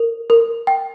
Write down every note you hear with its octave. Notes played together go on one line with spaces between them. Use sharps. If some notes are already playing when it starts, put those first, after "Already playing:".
Already playing: A#4
A#4
G5